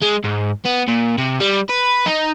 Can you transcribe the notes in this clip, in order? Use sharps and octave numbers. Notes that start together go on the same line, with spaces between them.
G#3
G#2
B3
A#2
C3
G3
B4
D#4